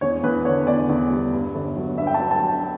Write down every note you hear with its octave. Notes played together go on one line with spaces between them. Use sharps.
E2 C#5
E2 B4
D3 C#5
E2 D5
E2
G3
G2
G1
F#3
G2 E5
G5
A5
F#3
A5
F#3
G5